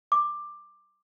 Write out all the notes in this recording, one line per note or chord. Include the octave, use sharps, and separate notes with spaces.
D6